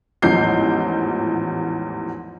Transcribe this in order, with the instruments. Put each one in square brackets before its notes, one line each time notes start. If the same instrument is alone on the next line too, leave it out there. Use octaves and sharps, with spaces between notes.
[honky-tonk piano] A1 E2 G#2 F3 G6 C7